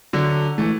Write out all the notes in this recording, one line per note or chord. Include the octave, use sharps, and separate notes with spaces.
D3 F#3
E3 A3